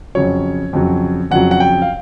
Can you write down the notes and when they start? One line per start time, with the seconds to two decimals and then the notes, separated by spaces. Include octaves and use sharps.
0.15 F2 C#3 F#3 C#5
0.73 F2 C#3 F#3
1.31 F2 C#3 F#3 F#5
1.51 F#5
1.60 G5
1.82 F5